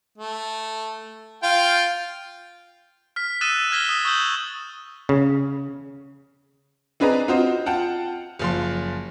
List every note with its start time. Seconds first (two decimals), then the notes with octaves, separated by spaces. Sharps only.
0.18 A3
1.43 F4 F5 G5
3.16 F6 B6
3.41 D#6 E6 F#6 A6 D#7 E7
3.71 E6 F6 G#6 A#6 B6 G7
3.89 D#6
4.05 C#6 D#6 E6 G6 F#7
5.09 C#3
7.00 C4 D4 G#4 B4 D#5 A#5
7.28 C4 F4 F#4 C5 D#5
7.66 F4 F#5 G5 A5
8.39 F#1 F3 C6